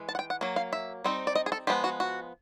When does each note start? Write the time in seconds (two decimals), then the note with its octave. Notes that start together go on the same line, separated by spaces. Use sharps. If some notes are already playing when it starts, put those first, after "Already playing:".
Already playing: E3 G#3
0.09 A5
0.15 F#5
0.19 G5
0.30 F#5
0.41 F#3 A#3
0.56 F5
0.73 E5
1.04 G3 C4 D#4
1.27 D5
1.35 D#5
1.46 G#4
1.52 A4
1.67 F3 G#3 B3 G4
1.84 F#4
2.00 F#4